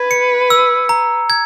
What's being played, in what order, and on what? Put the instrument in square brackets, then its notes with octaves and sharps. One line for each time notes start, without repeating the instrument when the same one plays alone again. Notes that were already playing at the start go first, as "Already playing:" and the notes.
Already playing: [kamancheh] B4 [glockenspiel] G#6
[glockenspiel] C#7
E6
A#5
G#6